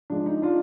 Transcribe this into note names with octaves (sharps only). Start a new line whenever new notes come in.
F3 G#3 D4
D#4
D4 F4